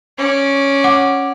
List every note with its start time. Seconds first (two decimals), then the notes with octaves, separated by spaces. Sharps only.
0.18 C#4 D5
0.84 F#5 D6